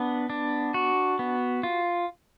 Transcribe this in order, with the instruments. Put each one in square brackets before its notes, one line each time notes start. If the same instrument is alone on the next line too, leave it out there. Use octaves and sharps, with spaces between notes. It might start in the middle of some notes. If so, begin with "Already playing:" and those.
Already playing: [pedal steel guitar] B3 D4
D4
F#4
B3
F4